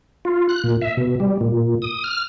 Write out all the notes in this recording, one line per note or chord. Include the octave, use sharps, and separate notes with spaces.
F4
F#6
A#2
E5
B2
G3
A#2
D#6
F6